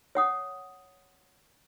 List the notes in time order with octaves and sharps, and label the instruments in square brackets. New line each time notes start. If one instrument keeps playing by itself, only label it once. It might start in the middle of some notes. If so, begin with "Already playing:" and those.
[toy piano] C#5 F#5 D#6